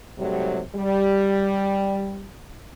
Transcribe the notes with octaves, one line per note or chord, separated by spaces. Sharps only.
G#2 C3 F#3 G3 A3
G3